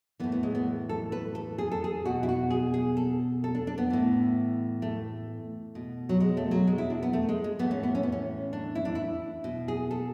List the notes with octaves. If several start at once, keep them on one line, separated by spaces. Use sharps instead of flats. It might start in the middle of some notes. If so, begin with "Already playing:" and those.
A2 E3 B3
B3
G#3
B3
A4
B4
A4
G#4
A4
G#4
B2 F#4
E4
F#4
G#4
G#4
A4
A4
D4
D4
B3
A2 E3
A3
B2
F#3
G#3
A3
F#3
G#3
E4
D4
B3
A3
G#3
G#3
A2 E3 B3
C#4
B3
C#4
B3
C#4
D4
E4
D4
E4
B2
G#4
A4